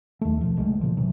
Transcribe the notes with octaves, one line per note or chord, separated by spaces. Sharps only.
D#2 A3
A#1 B2 F3
D1 C2 G#3 A3
A#2 C#3 F3
G2 C3 E3 F#3